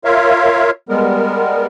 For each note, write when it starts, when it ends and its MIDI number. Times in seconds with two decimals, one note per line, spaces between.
0.05 0.71 65
0.05 0.71 70
0.05 0.71 73
0.05 0.71 76
0.05 0.71 77
0.89 1.66 55
0.89 1.66 56
0.89 1.66 59
0.89 1.66 70